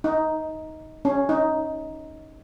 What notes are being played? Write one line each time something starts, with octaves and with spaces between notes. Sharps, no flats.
D#4
C#4
D#4